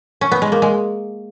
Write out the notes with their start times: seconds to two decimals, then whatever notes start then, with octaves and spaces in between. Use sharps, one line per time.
0.21 C#4
0.32 B3
0.42 G#3
0.52 A#3
0.62 G#3